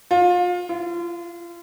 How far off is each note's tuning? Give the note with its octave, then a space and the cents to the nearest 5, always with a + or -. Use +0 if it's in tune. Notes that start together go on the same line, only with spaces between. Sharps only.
F4 +30
F4 -30